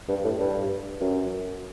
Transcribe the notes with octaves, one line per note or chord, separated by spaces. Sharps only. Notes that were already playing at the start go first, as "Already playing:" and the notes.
G2
A2
G2
F#2